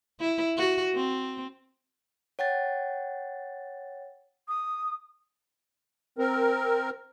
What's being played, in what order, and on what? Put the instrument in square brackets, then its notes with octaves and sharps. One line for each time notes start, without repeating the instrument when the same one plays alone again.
[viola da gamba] E4
F#4
C4
[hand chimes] C#5 F#5 G5 A6
[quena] D#6
[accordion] C4 A#4